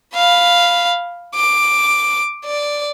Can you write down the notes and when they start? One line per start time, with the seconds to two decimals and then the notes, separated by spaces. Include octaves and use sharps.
0.15 F5 B5
1.35 D6
2.45 D5